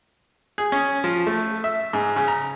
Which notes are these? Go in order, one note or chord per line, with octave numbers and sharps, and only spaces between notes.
G#4
C#4
F3
A3
E5
G#2
C#3
A#5